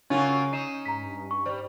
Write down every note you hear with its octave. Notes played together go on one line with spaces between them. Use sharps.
C#3 F#3 A#3 C#4 F4
D#4 C7 D#7 E7
G#2 A#5 B6
G2
C#6
G3 C5